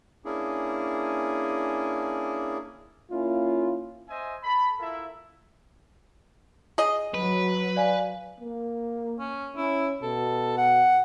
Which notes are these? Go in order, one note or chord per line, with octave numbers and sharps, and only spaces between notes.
A#3 C#4 D4 E4 G#4
A#3 C#4 E4 F4
C5 D#5 E5 G#5
A4 B5
E4 F4 A4 A#4 E5
G#4 D#5
F#3 B4
D5 F5 G#5
A#3
C#4
C#4 E4
B2 A4
F#5